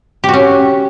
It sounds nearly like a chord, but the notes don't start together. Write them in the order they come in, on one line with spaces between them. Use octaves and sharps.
G4 F#4 C#4